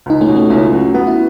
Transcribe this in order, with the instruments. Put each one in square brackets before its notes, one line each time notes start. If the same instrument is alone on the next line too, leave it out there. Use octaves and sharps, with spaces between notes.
[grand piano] C#2 [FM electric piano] D#4
[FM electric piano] A3 C#4
[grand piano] B2
[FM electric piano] A3 C#4
[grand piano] C#2 [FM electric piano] C#4 E4
[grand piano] F#3
[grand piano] B3 [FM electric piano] F#4
[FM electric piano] E4